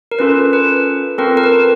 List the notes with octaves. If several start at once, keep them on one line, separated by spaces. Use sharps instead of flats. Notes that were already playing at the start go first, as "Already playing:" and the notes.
A#4
C#4 F4 A4 B4
B4
C4 F4 A4 A#4
A#4
B4